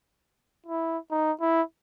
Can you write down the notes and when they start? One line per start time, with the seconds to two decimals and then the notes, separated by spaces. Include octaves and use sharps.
0.66 E4
1.11 D#4
1.41 E4